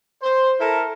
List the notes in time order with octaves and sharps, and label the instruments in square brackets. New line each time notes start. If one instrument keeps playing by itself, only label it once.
[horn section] C5
E4 A4 A#4